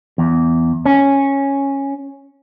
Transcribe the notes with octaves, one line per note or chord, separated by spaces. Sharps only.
E2
C#4